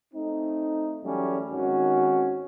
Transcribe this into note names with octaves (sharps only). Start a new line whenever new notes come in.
A3 C4 D#4
E2 F#3 G3 A3 C#4
G#1 D#3 C#4 F#4